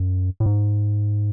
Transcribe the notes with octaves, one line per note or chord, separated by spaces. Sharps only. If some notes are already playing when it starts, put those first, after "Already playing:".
Already playing: F#2
A2
G#2